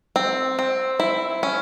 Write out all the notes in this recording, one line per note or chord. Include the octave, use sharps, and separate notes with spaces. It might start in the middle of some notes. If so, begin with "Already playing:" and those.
C4
C4
E4
C#4